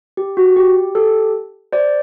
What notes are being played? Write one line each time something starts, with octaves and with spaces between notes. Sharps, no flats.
G4
F#4
G4
G4 A4
C5 D5